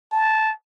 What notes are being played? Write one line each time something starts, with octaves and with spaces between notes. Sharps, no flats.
A5